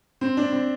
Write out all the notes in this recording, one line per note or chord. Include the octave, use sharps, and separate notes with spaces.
C4
D4
C4